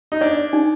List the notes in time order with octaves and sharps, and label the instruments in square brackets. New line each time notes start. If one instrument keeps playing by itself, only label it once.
[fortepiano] D#4
[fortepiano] D4 [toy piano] D5
[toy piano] D5
D#4